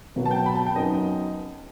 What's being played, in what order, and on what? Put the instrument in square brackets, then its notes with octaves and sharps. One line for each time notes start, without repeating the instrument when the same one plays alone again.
[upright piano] B2 F#3 B3
[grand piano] A5
G5
B5
A5
G5
[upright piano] F#2 F#3 B3 D#4 [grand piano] D#5